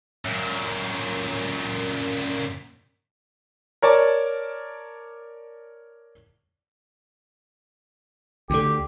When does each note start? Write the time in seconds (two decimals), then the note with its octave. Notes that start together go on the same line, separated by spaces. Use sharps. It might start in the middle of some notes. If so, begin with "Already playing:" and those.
0.25 F#2 A#2
3.82 A#4 C#5 D5 A5
8.50 D2 D3 G4